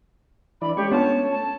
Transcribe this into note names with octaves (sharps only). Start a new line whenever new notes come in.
E3 D4 D5 B5
G#3 A3 C#4 G4 C#6
B3 D4 F4 C#5 A5
A5